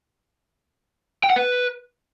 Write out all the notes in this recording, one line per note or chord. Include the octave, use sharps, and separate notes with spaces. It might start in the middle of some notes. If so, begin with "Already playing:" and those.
G5
F#5
B4